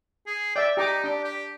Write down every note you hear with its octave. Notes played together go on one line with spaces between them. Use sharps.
G#4
D5 E5 G5
D#4 G4 A#5 D6
D4 G4
G4